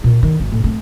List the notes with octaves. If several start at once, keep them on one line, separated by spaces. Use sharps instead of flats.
A#2
D#3
G#1
A2
A3 C4